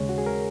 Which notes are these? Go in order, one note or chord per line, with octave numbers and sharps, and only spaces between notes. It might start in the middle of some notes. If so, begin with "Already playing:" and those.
Already playing: D#2 C#3 G#3 C#5
F#4
G#4
A#4